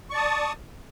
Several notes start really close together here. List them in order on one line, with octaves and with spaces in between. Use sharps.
C#6 D5 A5 D#6